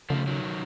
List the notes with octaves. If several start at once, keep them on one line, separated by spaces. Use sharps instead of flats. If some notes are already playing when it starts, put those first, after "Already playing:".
C#3 F3 A3
D#3 F#3